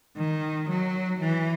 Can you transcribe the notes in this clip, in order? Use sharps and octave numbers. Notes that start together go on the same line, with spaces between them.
D#3
F#3
E3